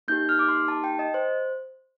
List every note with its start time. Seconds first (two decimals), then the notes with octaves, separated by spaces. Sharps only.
0.08 A#3 D#4 G4 G6
0.29 F6
0.39 D6
0.48 C6
0.68 A5
0.84 G5
0.99 D#5
1.14 C5